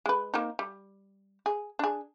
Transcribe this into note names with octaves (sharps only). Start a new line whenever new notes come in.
G#3 B4
A#3 C4 D#4
G3
G#4
D4 G#4